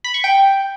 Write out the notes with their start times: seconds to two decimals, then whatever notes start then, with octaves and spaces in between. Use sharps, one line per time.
0.04 B5
0.14 C#6
0.24 G5